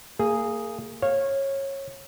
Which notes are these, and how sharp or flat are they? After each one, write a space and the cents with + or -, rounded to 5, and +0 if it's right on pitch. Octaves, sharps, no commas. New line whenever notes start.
A#3 -25 G#4 +0
C#5 -20 F5 +0